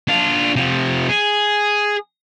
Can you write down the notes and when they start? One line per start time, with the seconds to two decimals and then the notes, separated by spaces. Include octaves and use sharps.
0.08 D4 F4
0.56 C3 F3
1.09 G#4